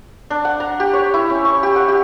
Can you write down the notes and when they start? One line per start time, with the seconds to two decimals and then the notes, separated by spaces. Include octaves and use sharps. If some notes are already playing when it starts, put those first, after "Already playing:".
0.30 D4
0.45 F#5
0.60 A#5
0.80 G4
0.93 C#5
1.14 E4
1.30 C#4
1.45 C#6
1.63 G4
1.76 F#5
1.88 G4